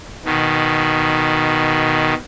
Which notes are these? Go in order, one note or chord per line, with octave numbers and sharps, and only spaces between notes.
B2 D#3